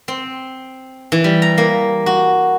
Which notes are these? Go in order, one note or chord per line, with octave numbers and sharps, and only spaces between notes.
C4
E3
G3
A#5
A#3
F#4